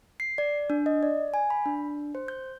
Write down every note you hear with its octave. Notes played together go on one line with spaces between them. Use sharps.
C7
D5
D4
D#5
D5
G#5
B5
D4
C5
G6